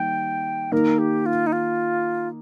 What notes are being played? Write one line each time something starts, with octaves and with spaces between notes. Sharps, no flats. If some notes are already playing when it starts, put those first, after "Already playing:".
Already playing: D#3 G3 A#3 G5
D#3 A#3 D#4 A#4
G4
F4
D#4
F4